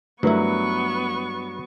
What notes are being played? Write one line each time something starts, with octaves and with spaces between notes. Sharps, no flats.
G2 F#3 A3 B3 E4 A#4 B4 C#6